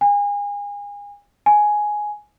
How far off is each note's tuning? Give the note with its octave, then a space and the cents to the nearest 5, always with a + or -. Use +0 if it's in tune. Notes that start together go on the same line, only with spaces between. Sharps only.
G#5 -35
G#5 +5